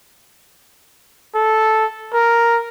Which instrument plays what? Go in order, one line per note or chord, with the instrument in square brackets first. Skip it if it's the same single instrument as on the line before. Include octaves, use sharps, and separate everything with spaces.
[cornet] A4
A#4